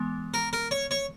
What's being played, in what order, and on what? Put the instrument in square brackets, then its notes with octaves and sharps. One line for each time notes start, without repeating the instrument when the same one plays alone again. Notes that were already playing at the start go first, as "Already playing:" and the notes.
Already playing: [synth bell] E3 G#3 B3
[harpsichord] A#4
A#4
C#5
C#5